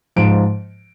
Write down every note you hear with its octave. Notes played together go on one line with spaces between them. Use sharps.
G#2 F3 D7